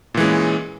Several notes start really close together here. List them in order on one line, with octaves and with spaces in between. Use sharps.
A#2 E3 G#3 C#4